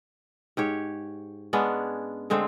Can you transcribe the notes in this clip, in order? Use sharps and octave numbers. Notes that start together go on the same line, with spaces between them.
G#2 G4 C#5
G#3 B3 C#4 D4
D3 G#3 A3 C4